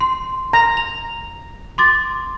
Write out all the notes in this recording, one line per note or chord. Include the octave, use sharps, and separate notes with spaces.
C6
A#5
F7
C6 D6 A6